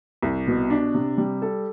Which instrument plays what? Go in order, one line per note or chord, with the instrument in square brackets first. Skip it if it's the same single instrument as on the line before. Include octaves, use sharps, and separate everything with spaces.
[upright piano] C2
B2
D4
C3
G3
A4